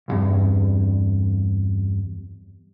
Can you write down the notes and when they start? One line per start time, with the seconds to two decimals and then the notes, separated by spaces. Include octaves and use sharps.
0.08 B1 E2 G2